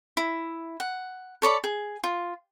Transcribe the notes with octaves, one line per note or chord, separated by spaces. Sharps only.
E4
F#5
A4 C#5 D5 B5
G#4
F4